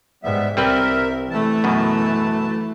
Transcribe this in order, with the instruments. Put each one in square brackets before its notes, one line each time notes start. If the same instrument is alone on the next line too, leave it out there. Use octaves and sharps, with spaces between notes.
[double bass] G#2 [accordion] G3 B3 E5
[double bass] C2 [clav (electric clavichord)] G3 C4 B4 [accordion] A#4 E5
[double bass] E3 A3 [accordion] A5
[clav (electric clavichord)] F#2 B2